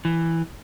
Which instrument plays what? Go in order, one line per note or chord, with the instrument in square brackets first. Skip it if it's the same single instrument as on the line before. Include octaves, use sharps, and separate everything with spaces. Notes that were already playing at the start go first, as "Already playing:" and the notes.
[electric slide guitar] E3